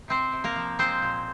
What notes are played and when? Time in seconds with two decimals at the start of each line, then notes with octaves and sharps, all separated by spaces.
0.08 C3 C4 C5
0.32 C3
0.44 A#3 A#4
0.56 F3
0.79 G#3 C4 C5
1.02 A#2